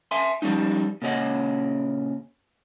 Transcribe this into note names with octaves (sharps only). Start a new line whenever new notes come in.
E5 G#5 C6
F3 G3 A3 C#4 D#4
A#2 C#3 C#4 G#4 D#5 F#5